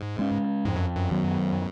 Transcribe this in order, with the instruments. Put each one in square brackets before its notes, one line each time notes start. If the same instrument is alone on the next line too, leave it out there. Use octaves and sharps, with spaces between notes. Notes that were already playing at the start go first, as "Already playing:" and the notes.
Already playing: [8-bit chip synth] G#2
[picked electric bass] G#3 C#4
[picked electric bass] F2 [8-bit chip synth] G#2
[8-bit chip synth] F#2
F#2
[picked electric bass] D#3 F#3 B3